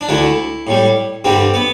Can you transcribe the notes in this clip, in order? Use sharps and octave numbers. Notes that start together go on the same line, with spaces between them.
D4
D2 D3 A3 E4
A2 G3
G2 D3 G3 C4
B3